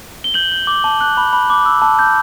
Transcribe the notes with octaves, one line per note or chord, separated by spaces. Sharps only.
G7
G6 F#7
G6
D6
A5
F#6
B5
B5
D6
E6
A5
G6